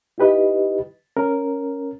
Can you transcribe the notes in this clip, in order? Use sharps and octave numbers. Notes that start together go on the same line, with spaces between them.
D#4 E4 G4 B4 D#5
C#4 A#4